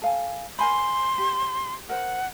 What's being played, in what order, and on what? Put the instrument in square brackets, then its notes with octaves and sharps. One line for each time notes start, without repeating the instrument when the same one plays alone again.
[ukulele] A4 F5 G#5
[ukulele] A#4 G#5 B5 [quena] C6
[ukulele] G4
[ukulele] A#4 C5 [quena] F#5